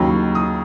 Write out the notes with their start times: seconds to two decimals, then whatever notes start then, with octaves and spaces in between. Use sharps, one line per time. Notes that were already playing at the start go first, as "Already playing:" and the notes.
Already playing: D#2 C#3 F#3 B5
0.35 D#6